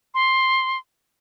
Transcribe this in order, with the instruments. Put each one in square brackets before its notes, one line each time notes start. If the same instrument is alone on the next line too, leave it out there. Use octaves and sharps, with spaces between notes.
[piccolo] C6